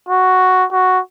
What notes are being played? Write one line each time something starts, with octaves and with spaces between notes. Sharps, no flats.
F#4
F#4